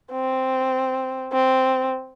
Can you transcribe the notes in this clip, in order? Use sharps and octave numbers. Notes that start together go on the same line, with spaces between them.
C4
C4